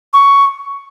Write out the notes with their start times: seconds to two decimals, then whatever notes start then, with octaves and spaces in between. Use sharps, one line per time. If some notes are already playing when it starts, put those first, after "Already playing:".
0.13 C#6